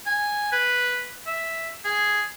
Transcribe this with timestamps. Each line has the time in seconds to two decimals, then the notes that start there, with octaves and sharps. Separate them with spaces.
0.06 G#5
0.52 B4
1.27 E5
1.84 G#4